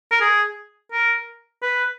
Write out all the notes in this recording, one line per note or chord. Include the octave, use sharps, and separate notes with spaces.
A#4
G#4
A#4
B4